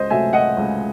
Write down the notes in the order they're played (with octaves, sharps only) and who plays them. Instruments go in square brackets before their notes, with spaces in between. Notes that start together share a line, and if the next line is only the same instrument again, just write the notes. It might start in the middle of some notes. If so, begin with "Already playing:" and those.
Already playing: [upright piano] C#2 C5 D#5
C3 F#3 A3 E5 G#5
D#5 F#5
C#2